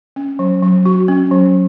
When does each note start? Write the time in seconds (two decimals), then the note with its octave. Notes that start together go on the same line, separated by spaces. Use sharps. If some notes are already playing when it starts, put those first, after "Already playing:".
0.16 C#4
0.39 F#3
0.63 F#3
0.86 F#4
1.08 C#4
1.31 F#3